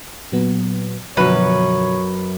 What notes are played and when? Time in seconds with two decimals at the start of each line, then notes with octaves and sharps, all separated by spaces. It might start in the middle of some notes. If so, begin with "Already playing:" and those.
0.32 A#2 F#3 B3
1.17 F#2 B2 D3 F3 B4 C#5